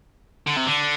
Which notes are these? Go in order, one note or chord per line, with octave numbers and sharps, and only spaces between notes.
D3
C3
D3